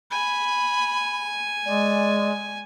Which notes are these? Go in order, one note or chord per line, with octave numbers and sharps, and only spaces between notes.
G#5 B5
G#3 D5